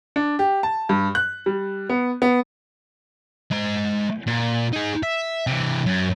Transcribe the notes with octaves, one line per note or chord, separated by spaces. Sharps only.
D4
G4
A5
G2
F#6
G3
B3
B3
G#3 A#5
A#2
D#4 G#4
E5
C3 E3
F#2